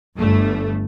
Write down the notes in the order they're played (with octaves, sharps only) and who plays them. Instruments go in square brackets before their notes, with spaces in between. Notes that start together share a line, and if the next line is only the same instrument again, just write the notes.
[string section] G1 G2 A3